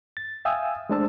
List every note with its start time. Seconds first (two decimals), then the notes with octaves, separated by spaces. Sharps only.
0.17 A6
0.45 E5 F5 G5 G#5 D#6 E6
0.90 G#3 A3 D4 C5 A5 E6